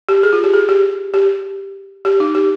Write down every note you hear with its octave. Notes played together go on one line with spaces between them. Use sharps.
G4
G#4
F4
G4
G#4
G4
G4
G4
D#4
G4